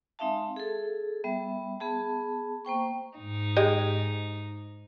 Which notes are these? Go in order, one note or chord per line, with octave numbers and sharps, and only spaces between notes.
G#3 C4 D#4 E5 F5 A5
G#4 A4
G3 B3 E5
B3 G#4 A5
A#3 C5 G5 C#6
G#2 D#4
G#3 G4 D#5